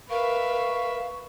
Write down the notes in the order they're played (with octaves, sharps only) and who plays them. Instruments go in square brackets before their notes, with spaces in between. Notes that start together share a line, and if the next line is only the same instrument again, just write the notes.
[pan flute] A#4 [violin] B4 E5 [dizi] F5 [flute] C#6